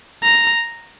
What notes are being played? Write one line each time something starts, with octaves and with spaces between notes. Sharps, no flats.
A#5